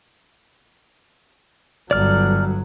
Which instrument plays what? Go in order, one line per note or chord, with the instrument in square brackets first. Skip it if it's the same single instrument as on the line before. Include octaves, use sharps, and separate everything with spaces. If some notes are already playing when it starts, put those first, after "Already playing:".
[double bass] G1 F#3 [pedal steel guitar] D5 F6